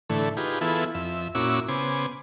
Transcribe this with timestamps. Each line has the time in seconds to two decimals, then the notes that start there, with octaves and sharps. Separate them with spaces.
0.10 A2 D3 E3 A3
0.37 D#4 F4 G4 G#4 B4
0.61 E3 B3 E4 F4 G#4 A4
0.95 F2 E5
1.35 A#2 C#4 E4 F#4 D6 E6
1.68 C#3 B3 C5 G#5 D6